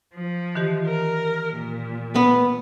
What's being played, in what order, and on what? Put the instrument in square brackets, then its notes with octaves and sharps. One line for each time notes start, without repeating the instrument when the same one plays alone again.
[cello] F3
[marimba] D#3 E3 G4
[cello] A#4
A#2
[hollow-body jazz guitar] B3